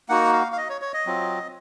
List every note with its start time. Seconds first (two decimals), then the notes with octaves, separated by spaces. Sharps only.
0.09 A#3 D#4 F#4 F#5
0.33 F5
0.52 F5
0.57 D#5
0.69 C#5
0.81 C#5
0.93 D#5
1.06 F#3 C4 F4